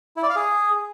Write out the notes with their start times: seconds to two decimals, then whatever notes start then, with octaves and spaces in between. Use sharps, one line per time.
0.17 E4
0.23 D5
0.30 F5
0.36 G#4